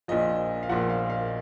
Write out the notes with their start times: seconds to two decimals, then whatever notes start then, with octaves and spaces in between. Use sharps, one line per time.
0.08 A#1 A#2 F3 D#5
0.63 F5
0.69 A#1 A#2 F3 F#5
0.89 F5
1.10 F5